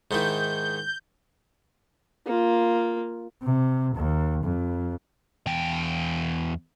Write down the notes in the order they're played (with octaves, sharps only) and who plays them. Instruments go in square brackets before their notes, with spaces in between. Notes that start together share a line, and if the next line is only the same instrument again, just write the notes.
[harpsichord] G#2 D#3 E4 [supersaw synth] G6
[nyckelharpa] A#3 F4
[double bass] C3
D#2
F2
[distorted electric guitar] E2 G5